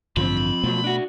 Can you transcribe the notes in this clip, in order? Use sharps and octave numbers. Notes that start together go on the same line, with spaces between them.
A1 G2 D3 F3 C4 B5
F#2 B2 F3 F#3 A3 B3
D4 F#4